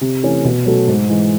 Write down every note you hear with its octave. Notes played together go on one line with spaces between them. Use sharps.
C3
E3 A3 C#4
B2
F#3 A3 C#4
G#2
E3 G#3